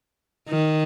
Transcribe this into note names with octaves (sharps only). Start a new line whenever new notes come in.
D#3